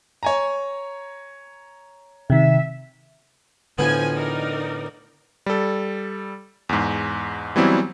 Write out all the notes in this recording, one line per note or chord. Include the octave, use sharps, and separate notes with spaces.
C#5 G#5 A#5
C3 D#3 E5
A2 D3 F3 B3 G#5
D#4 A#4 D5
G3 A4
E2 G#2
E3 F#3 G3 B3 C4 E4